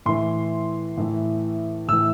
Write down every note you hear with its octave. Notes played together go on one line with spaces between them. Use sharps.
A2 E3 C6
A2 E3
A2 E3 E6